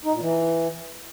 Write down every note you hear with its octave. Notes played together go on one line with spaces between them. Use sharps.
D#4
A#2
E3